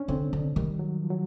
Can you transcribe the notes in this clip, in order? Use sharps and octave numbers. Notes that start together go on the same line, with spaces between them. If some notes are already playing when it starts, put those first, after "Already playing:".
Already playing: C#4 D4
D3 C4
D3
D#3 G3
F#3
F3
F#3